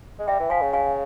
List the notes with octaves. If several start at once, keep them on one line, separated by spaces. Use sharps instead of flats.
G#3
G3 E5 G5
E3
F3 F5 G#5
C#3
F5 G#5